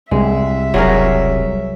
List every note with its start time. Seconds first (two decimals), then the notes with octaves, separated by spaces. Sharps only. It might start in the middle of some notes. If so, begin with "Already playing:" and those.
0.11 C2 G#3 E5
0.74 E1 F#3 G#4 A#4